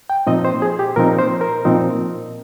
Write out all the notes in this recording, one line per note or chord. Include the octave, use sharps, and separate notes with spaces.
G5
A#2 F3 C4 D#4 D#5
C5
G#4
G4
A#2 F3 C4 D#4 A#4
C5
A#4
A#2 F3 C4 D#4